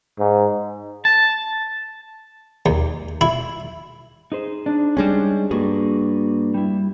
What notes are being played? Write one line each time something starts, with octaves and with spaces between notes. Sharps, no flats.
G#2
A5
D#2
E4
D#4 G#4 C5
D4
G3 G#3 C#4
G2 A#3 F#4 G#4
G3 E4